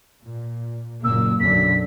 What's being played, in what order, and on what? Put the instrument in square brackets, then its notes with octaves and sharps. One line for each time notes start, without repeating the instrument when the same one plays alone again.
[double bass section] A#2
[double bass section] F#1 A#2 A#3 [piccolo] E6
[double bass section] B1 F#2 D3 [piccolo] B6